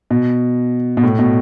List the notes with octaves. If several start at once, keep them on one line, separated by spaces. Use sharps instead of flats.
B2
B2
A2
B2